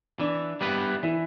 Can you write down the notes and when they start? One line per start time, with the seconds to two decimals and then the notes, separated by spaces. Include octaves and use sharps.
0.19 E3 D4
0.61 G3 B3 E4 B4
1.03 E3 E4